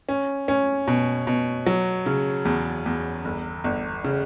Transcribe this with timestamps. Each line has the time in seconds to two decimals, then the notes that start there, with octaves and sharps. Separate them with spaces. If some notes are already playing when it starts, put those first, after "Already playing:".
0.09 C#4
0.48 C#4
0.88 B2
1.27 B2
1.66 F#3
2.06 C#3
2.45 E2
2.86 E2
3.25 G1
3.64 G1
4.04 C#3